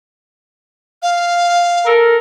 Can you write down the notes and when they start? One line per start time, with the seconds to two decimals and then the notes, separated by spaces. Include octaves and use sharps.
1.02 F5
1.86 A4 A#4